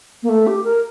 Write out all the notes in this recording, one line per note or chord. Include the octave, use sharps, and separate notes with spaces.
A#3
A3
G4
A#4